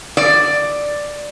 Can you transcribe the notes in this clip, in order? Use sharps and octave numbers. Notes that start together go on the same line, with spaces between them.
D5